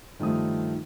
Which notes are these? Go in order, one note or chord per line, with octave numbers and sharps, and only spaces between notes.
G2 D#3 F3 A3 D#6